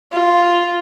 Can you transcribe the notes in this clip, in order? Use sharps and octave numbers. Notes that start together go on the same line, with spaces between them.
F4